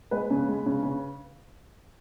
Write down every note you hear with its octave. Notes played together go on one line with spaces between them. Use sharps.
G#3 B4
C#3
G#3
C#3
C#3